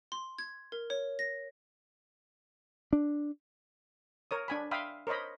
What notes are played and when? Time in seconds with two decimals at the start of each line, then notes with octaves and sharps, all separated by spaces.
0.12 C6
0.38 G#6
0.72 A#4
0.90 C#5
1.19 A#6
2.93 D4
4.31 A#4 C#5 D#6
4.48 D4 G#5 B5
4.71 E5 F5 G5 B5 C6 D#6
5.07 A#4 C5 C#5 D#5 B5